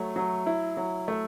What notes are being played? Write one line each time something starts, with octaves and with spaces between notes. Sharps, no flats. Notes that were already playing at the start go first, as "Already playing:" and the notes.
Already playing: F#3 A3
F#3
E4
F#3
A3